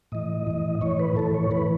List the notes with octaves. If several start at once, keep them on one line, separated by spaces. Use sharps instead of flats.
A2 E3 D#5
A2 E3
A2 E3 C#5
B4
A2 E3 A4
C#5
A2 E3 B4